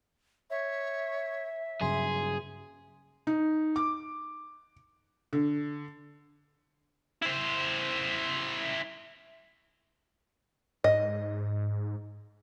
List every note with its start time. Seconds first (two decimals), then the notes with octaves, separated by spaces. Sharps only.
0.50 C#5 E5
1.81 G2 C#3 F#3 G#4 C6
3.27 D#4
3.76 D6
5.33 D3
7.22 E4 C5
10.84 G#2 D#5